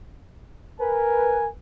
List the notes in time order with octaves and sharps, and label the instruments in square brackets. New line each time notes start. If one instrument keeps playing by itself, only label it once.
[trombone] A#4 [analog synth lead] B4 [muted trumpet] G#5